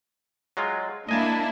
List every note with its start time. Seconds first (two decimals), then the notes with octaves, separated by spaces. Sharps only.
0.57 F#3 G#3 F4
1.09 A#3 D4 E4 D#5 G#5 A5